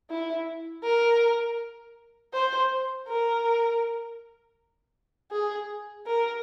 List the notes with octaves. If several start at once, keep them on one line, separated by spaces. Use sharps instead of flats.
E4
A#4
C5
A#4
G#4
A#4